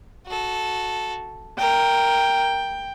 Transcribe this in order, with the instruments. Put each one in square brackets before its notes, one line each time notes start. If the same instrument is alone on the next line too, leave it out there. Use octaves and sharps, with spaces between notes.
[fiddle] F#4 A4
[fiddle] A#4 [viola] G5